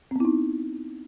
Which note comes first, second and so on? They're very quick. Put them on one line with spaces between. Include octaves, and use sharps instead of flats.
C4 B3 E4 D#4